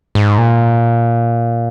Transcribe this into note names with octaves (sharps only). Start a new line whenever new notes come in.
G#2
A#2